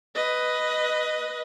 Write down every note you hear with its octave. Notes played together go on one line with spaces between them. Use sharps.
B4 D#5